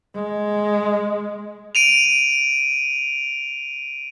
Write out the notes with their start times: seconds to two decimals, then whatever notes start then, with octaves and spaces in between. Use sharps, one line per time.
0.15 G#3
1.75 D7 D#7 F7